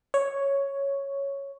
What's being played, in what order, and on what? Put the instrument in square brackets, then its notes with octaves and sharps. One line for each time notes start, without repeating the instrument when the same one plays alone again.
[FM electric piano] C#5